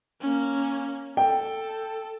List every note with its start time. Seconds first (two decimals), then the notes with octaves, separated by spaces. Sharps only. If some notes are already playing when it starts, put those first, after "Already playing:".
0.21 A#3 C#4
1.17 A4 G5